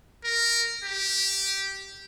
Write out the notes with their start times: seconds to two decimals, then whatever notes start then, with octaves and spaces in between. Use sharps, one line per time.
0.24 A#4
0.84 G4